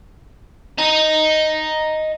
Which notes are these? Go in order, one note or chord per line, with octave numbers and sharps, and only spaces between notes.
D#5 A#5